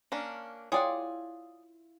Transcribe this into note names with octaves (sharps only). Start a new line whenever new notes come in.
A#3 C#4 D4
E4 F4 G#4 C#5 D5 F#5 G5 D#6